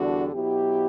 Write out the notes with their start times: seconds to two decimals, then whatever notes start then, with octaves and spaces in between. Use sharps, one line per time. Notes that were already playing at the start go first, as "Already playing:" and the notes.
Already playing: E2 D3 G3 D4 F#4
0.33 B2 F#3 B3 E4 G4